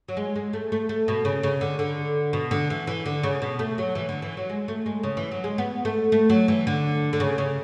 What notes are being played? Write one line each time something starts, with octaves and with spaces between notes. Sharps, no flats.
F#3
G#3
G#3
A3
A3
A3
B2
C#3
C#3
D3
D3
B2
D3
E3
E3
D3
C#3
B2
A3
F#3
E3
D3
E3
F#3
G#3
A3
G#3
C#3
E3
F#3
G#3
B3
A3
A3
F#3
E3
D3
D3
C#3
C#3